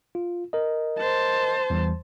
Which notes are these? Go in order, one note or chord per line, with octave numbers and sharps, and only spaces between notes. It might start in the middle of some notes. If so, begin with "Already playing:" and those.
F4
A#4 D#5
C5 A5
E2 E3 G3